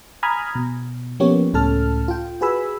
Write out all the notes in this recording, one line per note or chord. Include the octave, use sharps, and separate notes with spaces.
G#5 A#5 B5 D#6 F6 G#6
B2
F3 A#3 B3 C#4 G4 C#5
C#2 A2 C#4 A4 A5 F6
F4 G5
F#4 G#4 B4 G#5 B5 E6